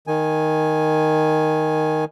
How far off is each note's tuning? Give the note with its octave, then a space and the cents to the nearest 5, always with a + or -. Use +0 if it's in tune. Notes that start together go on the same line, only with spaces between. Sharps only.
D#3 +0 G#5 +0